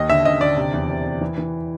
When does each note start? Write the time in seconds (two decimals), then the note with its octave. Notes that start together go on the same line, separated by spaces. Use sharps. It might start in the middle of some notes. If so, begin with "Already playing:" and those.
Already playing: D#2 D#5
0.10 D3 E5
0.25 D3 D#5
0.41 D3 D5
0.57 C3
0.74 E2
0.90 C3
1.06 C3
1.21 E3
1.38 E3